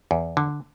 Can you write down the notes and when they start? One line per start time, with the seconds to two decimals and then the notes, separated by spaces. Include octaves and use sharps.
0.11 E2
0.37 D3